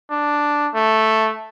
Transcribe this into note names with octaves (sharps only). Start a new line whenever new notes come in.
D4
A3